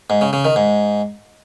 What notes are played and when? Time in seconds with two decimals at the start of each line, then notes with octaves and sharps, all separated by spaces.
0.10 G#2
0.21 C#3
0.33 C#3
0.45 D#3
0.56 G#2